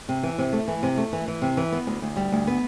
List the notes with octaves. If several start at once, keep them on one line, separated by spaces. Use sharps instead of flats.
C3
E3
C3
A3
E3
C3
A3
E3
E3
C3
E3
B3
D2
D2
G3
D2
B3